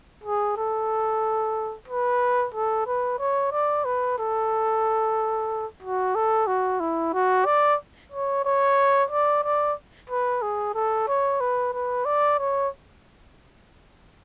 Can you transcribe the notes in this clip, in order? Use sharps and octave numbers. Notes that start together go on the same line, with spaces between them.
G#4
A4
B4
A4
B4
C#5
D5
B4
A4
F#4
A4
F#4
E4
F#4
D5
C#5
C#5
D5
D5
B4
G#4
A4
C#5
B4
B4
D5
C#5